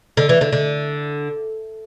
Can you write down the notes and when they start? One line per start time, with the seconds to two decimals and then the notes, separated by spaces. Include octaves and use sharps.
0.17 D3
0.29 E3
0.41 D3
0.52 D3